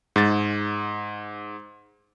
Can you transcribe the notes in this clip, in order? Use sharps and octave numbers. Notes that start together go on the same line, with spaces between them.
G#2 A6